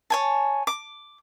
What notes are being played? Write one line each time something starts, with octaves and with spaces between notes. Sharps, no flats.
C#5 G#5 A5
D6